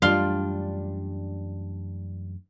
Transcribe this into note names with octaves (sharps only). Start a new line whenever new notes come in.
F#2 E3 G3 A3 D4 F4 F5 C6